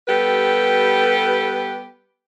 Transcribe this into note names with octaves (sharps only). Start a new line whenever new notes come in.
G3 B3 G4 A4 B4